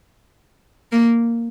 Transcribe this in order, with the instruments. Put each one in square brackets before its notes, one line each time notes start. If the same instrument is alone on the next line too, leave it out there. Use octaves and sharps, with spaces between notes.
[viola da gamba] A#3